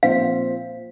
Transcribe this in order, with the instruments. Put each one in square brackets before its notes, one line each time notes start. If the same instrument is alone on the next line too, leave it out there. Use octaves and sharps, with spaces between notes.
[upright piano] A#2 F3 C4 F4 [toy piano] F5